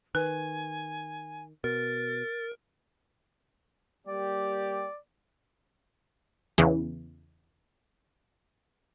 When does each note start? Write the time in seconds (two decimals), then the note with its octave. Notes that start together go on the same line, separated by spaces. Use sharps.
0.15 D#3 B4 G#5
1.64 B2 A#4 A6
4.07 G3 A#3 G4 D5
6.58 E2 C#3 E3